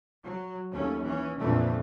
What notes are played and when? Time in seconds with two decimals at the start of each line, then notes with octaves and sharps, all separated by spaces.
0.23 F#3
0.71 D#2 A3 A#3 C#4
1.03 E3 C#4
1.40 F2 A#2 D3 E3 A3